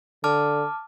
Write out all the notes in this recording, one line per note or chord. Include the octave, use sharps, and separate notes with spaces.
D3 A5 D6 F6